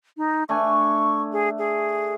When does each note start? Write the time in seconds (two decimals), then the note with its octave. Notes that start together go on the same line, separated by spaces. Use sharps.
0.17 D#4
0.49 A3 D4 G#5 C#6
1.32 G#4
1.58 G#4